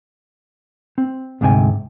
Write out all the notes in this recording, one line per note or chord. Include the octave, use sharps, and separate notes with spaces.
C4
D2 G#2 C3 G5 G#5